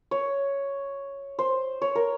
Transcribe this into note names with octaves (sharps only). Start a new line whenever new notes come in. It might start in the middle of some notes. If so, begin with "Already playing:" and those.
C#5
C5
C#5
A#4